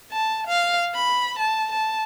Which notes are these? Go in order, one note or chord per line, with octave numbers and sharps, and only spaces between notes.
A5
F5
B5
A5
A5